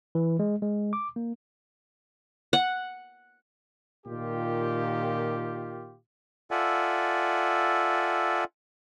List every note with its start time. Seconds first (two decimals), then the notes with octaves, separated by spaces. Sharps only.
0.15 E3
0.39 G#3
0.62 G#3
0.93 D6
1.16 A#3
2.53 F#5
4.06 A#2 D#3 F4 G4
6.51 F4 A4 D5 E5 F#5 G#5